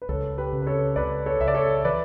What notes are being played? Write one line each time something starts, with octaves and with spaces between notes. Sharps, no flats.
B4
C#2 A4 C#5
G4 B4
C#3
B4
A4 C#5
C#2 B4 D5
A4 C#5
C#2 E5
D5
A4 C#5
E3 B4 D5